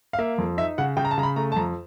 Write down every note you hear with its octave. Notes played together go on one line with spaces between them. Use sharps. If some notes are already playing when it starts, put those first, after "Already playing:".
F5
A#3 E5
F2
D#4 E5
C#3 F#5
C#3 G5
A#5
A5
C#3 A#5
B5
A3 A#5
A5
F2 A#5